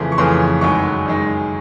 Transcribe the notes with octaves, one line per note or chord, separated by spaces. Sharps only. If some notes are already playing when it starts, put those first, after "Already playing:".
Already playing: F2 C#3 E3 A3 C6
C#6
F2 C#3 E3 A3 C6
F#2 D#3 G#3 C#6
F#2 D#3 G#3